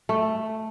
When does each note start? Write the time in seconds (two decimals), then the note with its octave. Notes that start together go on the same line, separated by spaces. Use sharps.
0.09 A3